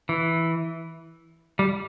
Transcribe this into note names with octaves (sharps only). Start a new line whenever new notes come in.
E3
G3